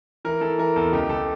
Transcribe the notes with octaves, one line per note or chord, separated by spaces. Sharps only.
E3 A#4
E3 A4
E3 A#4
E2 A4
C#2 G4
C#2 A4